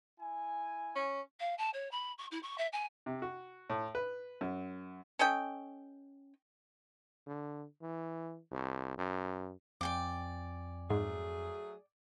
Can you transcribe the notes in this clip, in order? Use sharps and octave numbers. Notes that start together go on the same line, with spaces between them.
E4 G#5
C#4
F5
A5
C#5
B5
C#6
E4
C#6
E5
G#5
C3
F#4
A2
B4
F#2
C#4 A4 D#5 G5
D3
E3
C2
F#2
F2 D5 G5 G#5 D6
G#2 F#3 A3 G#4